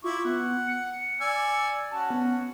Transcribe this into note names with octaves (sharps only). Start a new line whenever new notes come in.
E4 F4 C#6 D6
B3 F#5
C#7
D5 G#5 E6
C#4 F#4 A5
B3